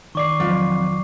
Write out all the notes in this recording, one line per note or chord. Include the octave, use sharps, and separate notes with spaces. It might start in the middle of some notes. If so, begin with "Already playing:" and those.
D#3 D5 C#6 D6 C7
F2 F#3